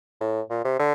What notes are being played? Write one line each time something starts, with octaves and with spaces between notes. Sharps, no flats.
A2
A#2
C3
D3